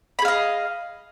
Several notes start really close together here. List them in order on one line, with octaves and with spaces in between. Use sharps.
B5 G#4 F5 D#5